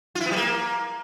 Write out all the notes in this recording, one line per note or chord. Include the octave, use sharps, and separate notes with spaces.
F4
E4
B3
G3
A#3